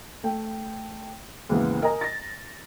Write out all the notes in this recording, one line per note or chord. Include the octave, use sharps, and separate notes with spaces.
A3 G5
D#2 G#2 C#3 E3 B3
A#4 D#5 G#5 A#5
A6 A#6